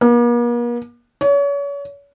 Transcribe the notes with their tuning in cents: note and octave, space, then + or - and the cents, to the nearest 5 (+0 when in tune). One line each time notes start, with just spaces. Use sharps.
A#3 +45
C#5 +35